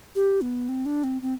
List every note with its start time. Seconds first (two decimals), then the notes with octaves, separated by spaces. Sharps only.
0.15 G4
0.41 B3
0.69 C4
0.86 D4
1.04 C4
1.22 C4